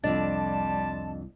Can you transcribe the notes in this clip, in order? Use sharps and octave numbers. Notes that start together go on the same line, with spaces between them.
C2 F2 G3 D4 F4 D#5 A5 A6